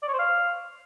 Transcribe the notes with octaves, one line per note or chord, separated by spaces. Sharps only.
D5
C#5
C5
F5